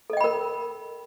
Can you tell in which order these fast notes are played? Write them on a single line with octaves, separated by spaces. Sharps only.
A4 D#5 G5 B5 A#4